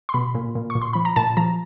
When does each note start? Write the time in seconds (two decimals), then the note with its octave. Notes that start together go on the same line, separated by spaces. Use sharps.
0.09 C6
0.14 B2 B5
0.35 A#2
0.55 A#2
0.70 C#6
0.75 A#2
0.82 C6
0.93 F3 B5
1.05 A#5
1.16 A#2 A5
1.37 F3 A#5